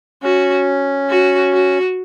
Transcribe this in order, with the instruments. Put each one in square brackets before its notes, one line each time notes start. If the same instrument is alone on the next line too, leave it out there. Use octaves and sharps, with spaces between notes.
[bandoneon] C#4 [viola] F#4
[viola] F#4
F#4